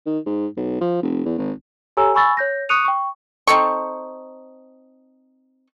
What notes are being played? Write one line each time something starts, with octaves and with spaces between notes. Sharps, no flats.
D#3
G#2
B1
F3
F1
E2
G#1
G4 A4 C#5 G#5 A#5 E6
G#5 B5 C#6 E6 A6
C#5 G6 A#6
C#6 D#6 F#6 C#7 D#7 F7
G5 C#6
C4 D#4 A4 C#6